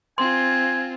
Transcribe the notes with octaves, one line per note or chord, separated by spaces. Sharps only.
C4 F4 G#5 C6